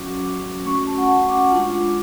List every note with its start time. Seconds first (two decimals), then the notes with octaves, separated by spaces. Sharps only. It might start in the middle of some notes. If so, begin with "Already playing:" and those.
Already playing: F#3 C#4 F#4 D6
0.23 D6
0.65 A3 C#4 F#4 C#6
0.76 C#6
0.87 A5
0.98 F#5
1.09 F#5
1.29 D6
1.51 G#3 D4 F4 D6